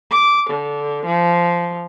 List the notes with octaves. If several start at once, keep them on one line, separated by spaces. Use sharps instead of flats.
D6
D3
F3